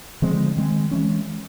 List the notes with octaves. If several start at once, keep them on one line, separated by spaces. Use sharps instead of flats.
D3 F3 G#3 C4
D#3 G#3 C4
E3 G#3 C#4